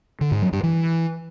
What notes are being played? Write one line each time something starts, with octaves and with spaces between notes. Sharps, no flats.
D3
G#2
F#3
G2
E3